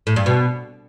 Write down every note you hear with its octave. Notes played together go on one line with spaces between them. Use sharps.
A2
G2
B2